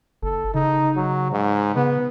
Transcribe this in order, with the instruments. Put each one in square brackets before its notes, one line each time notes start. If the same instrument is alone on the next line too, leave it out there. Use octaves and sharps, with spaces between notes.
[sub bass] F#1 [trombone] A4
[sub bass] C#3 [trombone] D#4
[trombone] F#3
G#2
[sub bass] C#3 [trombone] B3